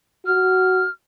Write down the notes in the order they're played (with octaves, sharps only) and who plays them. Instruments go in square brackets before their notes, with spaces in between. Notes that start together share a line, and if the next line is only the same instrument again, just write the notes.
[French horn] F#4 [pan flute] F6